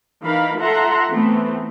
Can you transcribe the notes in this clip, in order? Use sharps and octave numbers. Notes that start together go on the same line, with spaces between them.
E3 D#4 A#4 F5 B5
F4 A4 E5 F#5 A#5 C6
E3 A3 B3 C4